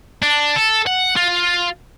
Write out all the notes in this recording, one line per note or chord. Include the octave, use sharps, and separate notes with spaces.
D4
A4
F#5
F4